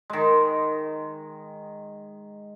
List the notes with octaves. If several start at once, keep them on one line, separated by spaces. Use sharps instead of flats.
D#3 G#3